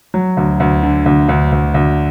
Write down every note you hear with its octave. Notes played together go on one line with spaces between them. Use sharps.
F#3
D2
D2
D3
D2
D2
D2
D2